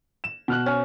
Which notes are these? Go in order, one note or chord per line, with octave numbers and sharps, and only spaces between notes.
E7
B2 F6 F#6
C#4